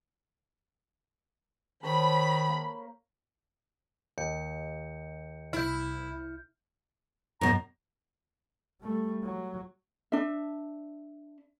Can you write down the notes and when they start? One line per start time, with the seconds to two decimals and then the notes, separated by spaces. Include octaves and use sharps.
1.83 D#3 C5 C#5 A5 B5
2.49 A#3
4.18 D#2 G6 C#7
5.53 C2 E4 F6 G6
7.41 F#2 B2 A#5
8.81 G3 A3
9.23 F#3
10.12 D4 E5